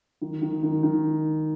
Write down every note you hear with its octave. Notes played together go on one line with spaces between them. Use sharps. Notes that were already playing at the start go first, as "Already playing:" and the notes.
D#3
D#3
D#3
D#3